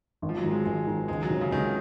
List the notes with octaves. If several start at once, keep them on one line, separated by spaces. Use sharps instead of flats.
G#1
F3
F#3
G#2 D#3
G#3
G#1 G#3
G#2 D#3
C#2 G#3
F#3
C3 D#3 G#3 C#4
C#3
C#2 D#3